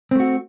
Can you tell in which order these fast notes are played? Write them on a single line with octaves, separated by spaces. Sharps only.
C4 A3 F#4